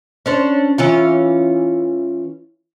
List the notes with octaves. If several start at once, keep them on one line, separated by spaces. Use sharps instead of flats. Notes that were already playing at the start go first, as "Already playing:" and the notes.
C#4 D4 C5
E3 C#4 F4